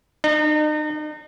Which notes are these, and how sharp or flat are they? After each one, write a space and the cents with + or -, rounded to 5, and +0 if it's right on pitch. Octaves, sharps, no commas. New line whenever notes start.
D#4 -40